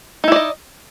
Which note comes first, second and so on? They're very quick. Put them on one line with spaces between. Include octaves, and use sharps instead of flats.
D#4 E4 D5 D#5